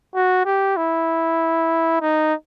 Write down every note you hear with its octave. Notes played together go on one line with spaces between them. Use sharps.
F#4
G4
E4
D#4